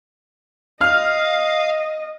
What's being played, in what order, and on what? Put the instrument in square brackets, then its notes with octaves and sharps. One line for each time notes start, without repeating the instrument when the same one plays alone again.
[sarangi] D#5 [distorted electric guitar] F5 [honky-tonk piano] F6